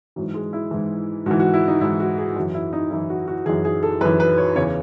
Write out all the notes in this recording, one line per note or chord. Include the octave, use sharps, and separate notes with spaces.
G#2 E3 F#3
G#3
E4
G#2 E3
G#2 E3 F#4
F#4
E4
D#4
G#2 E3 E4
F#4
G#4
F#2 E3 F#4
E4
D#4
F#2 E3 E4
F#4
F#4
F#2 E3 G#4
G#4
A4
F#2 E3 B4
B4
C#5
E2 C#3 E3 C#5